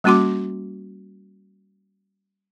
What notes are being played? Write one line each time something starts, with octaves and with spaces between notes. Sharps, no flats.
G3 A#3 C#4 F#4 C6 D6